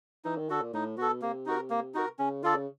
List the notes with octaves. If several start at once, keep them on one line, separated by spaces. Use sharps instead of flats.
E3 D#4
D#3
D3 F#4 A4
A#2
A2 D#4
B2 F#4 A4
C3 A#3
D#4 F#4 A#4
A#3
D#4 F#4 A#4
C#3 C#4
D3 F4 A4 D5
C#3